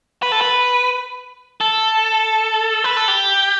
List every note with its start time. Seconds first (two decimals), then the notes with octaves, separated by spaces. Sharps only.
0.22 B4
0.32 A4
0.41 B4
1.61 A4
2.84 B4
2.97 A4
3.08 G4